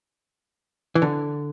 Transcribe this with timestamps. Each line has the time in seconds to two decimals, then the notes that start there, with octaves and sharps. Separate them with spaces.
0.95 E3
1.02 D3